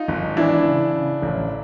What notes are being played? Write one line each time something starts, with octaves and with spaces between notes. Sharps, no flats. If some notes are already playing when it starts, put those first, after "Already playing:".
Already playing: D#4 F4
G#1
E3 D4 E4
C#3
C#3
A1